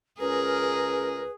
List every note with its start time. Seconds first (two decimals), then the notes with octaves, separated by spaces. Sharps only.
0.20 C#2 C#4 G#4 A#4 B4